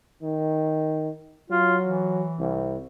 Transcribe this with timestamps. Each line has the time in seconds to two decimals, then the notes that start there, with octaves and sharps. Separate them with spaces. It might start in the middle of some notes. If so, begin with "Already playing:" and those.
0.22 D#3
1.50 F#3 F4
1.86 E3
2.39 C2